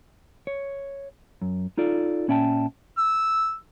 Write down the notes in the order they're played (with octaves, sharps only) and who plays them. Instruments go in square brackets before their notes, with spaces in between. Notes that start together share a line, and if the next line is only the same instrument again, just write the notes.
[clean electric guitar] C#5
F#2
D#4 F4 A4 D5
A#2 C#4 D5 E5 G5 A5
[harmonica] E6